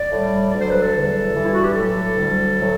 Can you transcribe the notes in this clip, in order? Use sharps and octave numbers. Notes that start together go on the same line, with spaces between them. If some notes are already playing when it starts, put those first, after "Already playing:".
Already playing: D5
A2 G3
D2 D3 F#3 D5
C5
B4
A4
E2 D3 G3
G2 E3 G3
E4
F#4
G4
A2 F#3 A4
D2 D3 G3
A2 F#3